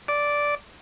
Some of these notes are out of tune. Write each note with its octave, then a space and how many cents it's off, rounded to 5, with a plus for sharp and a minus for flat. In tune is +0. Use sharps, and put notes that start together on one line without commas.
D5 -5